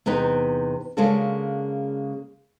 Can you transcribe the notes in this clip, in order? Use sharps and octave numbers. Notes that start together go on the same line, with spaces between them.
E2 C3 D#4 B4 G5
C#3 G#3 A#3 D4 F#4 A4